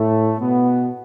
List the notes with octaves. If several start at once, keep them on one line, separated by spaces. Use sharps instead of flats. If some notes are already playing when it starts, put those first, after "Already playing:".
Already playing: A2 A3
B2 B3